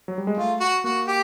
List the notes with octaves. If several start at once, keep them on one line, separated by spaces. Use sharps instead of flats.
F#3
G3
G#3
A3 F4
F#4
A#3 F#4
G4